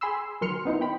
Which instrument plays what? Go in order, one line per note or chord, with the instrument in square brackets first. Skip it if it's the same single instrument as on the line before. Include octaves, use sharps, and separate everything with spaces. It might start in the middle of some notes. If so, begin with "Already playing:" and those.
[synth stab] G#4 G#5 B5 C6 E6
D#3 F#3 A#4 C6 F6 C#7
B3 D#4 E4 C5
G5 B5